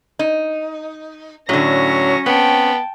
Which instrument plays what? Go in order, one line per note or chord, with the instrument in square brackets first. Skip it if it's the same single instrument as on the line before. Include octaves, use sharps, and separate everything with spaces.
[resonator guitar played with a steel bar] D#4
[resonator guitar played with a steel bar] A2 D3 [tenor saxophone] F#3 [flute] C#4 [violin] A#6
[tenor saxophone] B3 [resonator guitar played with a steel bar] C4 [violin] G5 A5